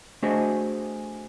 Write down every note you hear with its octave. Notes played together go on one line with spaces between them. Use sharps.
A3 D4 F#4 G#4 C5 D#5